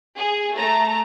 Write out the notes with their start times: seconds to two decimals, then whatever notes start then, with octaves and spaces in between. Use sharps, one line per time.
0.18 G#4
0.57 A3 A5 A#5